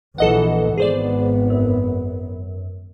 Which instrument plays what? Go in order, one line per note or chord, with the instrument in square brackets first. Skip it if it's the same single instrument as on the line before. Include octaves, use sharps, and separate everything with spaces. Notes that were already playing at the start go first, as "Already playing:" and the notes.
[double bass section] A#1 E3 [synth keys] A4 D#5 F#5
[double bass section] G#1 B3 [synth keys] G#4 C5 D5
[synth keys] F#2